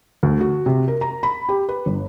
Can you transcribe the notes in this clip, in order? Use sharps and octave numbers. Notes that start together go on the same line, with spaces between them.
D2
F#4
C3
A#4
A#5
B5
G4
B4
G1